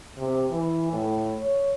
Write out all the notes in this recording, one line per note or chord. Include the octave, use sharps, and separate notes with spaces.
C3
E3
A2
C#5